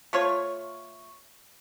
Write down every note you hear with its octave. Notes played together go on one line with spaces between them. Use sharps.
A3 F4 C#5 C#6